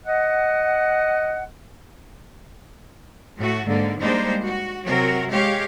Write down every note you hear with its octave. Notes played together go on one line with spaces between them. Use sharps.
D#5 F#5
A2 A3 F#4
G#2 D3 A#3
G3 G#3 A#3 D4 D#4 C5
F#4
C3 F#3 F#4 A#4
G#3 G4 C#5 F5